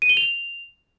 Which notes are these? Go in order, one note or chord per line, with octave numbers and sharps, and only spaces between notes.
D#7
G7
F7